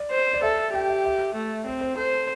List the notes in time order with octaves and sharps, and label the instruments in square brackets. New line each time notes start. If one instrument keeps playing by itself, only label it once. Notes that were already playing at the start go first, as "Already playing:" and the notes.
Already playing: [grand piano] D5
[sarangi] C5
[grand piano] D5
[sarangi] A4 [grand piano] E5
[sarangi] G4 [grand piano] G5
[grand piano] E5
E5
[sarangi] A3
[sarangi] C4 [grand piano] C5
[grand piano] C5
[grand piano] A4 [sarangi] C5